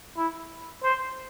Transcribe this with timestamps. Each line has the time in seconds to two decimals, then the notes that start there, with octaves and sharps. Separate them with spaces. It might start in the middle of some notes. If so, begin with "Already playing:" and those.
0.17 E4
0.83 C5